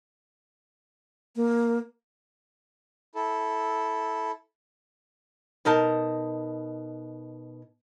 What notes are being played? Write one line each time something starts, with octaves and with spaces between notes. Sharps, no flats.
A#3
E4 A4
B2 D#4 A#4 A5